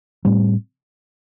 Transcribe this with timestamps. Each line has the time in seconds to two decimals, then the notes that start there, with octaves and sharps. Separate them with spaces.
0.25 A2 G3 C4